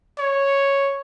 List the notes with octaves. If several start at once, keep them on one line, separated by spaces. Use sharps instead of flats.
C#5